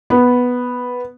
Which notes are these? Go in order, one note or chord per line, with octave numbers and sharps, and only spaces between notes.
B3